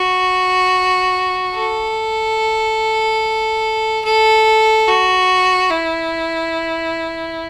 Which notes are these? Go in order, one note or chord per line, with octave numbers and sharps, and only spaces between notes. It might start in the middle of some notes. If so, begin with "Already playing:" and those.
Already playing: F#4
A4
A4
F#4
E4